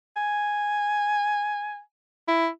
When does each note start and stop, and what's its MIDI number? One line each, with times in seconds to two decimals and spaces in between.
0.16 1.80 80
2.28 2.48 64